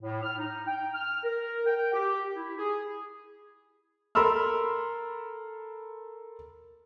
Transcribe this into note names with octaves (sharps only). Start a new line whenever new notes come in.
A2
F6
D#4
G5
F6
A#4
G5
G4
E4
G#4
A4 A#4 B5 C6 E6 F6